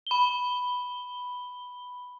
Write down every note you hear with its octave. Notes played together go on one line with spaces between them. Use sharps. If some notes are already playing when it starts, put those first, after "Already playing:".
B5 G7